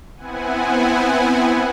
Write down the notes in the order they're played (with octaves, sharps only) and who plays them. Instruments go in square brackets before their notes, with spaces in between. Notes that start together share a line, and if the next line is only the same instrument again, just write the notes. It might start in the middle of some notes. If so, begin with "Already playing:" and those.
[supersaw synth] B3 C4 E4 F#5 G#5